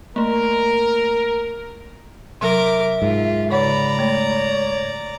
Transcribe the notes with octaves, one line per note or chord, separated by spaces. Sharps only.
A3 A#3 A#4
C3 F#3 A#4 E5 D6
G#2 F4
C#3 C#5 D5 F#5 A#5 B5
A3 C#5